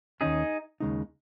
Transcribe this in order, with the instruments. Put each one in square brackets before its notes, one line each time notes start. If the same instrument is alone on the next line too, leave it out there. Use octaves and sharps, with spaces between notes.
[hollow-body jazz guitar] D#2 D#3 C#4 [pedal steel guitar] D#4 G#4
[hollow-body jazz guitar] D#2 C#3 G#3 D#4